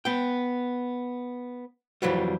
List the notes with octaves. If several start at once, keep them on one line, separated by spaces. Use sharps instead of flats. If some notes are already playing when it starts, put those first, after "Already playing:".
B3 G5
F2 E3 F#3 G3